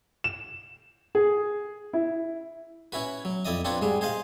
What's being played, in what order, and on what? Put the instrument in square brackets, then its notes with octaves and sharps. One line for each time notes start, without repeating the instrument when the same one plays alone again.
[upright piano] E7
G#4
E4
[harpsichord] C#4 E4 F#4 B4
F#3
F2 E4 D5 D#5 D#6
C4 D4 F4 B4 C#5
G#2 G3 G#4
G#4 C5 D#5 F5